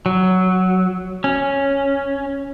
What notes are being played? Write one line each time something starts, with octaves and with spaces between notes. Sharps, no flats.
F#3
C#4